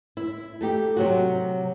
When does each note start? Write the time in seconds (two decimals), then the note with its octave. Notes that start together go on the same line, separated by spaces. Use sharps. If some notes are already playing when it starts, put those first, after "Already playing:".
0.17 E4
0.61 A3 D#4 G4
0.97 C3 F#3 F#4